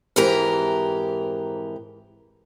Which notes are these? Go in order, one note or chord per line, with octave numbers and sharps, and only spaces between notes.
F2 G#2 E3 G4 A#4 A#5